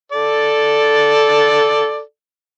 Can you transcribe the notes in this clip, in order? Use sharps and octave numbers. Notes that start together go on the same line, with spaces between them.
A4 D5